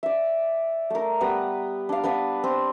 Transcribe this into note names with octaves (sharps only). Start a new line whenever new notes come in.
D5 E5
A3 A#4
G3 B3 B4 A#5
D4 F5
B3 D4 B4 F5
C4